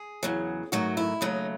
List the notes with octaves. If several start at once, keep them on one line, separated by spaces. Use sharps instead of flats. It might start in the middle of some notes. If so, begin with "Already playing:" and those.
Already playing: G#4
E2 C#3 F#3
G#2 D#3 F#3 A3 F#4
E4
D#2 C#3 F#3 A3 D#4